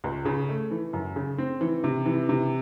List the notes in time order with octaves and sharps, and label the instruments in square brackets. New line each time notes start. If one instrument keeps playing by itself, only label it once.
[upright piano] C#2
C#3
A3
E3
F#2
C#3
C4
E3
C3
E3
C3